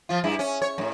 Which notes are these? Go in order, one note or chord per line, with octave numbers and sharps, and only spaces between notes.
F3 F4
G2 E4 G#4
C#4
C#5
F#2 A2